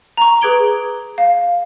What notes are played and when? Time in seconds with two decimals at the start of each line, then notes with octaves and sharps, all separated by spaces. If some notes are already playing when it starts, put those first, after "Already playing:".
0.17 A#5 C#6
0.41 G#4 B4 D6 G#6 D7 G7
1.18 F5